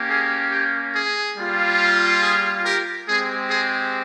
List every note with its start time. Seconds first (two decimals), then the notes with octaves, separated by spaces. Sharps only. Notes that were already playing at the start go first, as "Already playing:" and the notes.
Already playing: A#3 C#4 G4
0.10 G#4
0.52 G4
0.95 G#4
1.37 G3 A#3 F4
2.22 G#4
2.65 G4 A#4
3.08 G#3 C4 G4 G#4
3.50 G#4